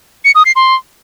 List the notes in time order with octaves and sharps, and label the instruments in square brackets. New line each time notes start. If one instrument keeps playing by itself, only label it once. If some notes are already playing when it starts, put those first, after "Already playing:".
[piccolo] C#7
D#6
C7
C6